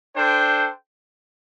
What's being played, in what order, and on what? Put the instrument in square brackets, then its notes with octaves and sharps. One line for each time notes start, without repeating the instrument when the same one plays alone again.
[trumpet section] D4 A4 C5 G5